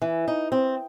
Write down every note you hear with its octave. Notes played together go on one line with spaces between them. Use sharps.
E3
D#4
C4